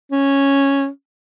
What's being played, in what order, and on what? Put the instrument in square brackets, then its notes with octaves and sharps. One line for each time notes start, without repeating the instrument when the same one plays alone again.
[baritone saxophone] C#4